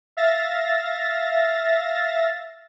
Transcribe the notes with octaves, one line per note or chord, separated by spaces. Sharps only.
E5 F5 A6 A#6